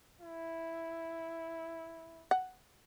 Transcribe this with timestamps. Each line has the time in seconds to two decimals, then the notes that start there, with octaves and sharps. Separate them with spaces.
0.21 E4
2.31 F#5